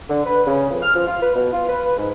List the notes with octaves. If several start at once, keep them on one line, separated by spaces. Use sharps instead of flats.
D3
B4
C#3
F2
F6
F3
F4
B4
B2
F4
B4
G#2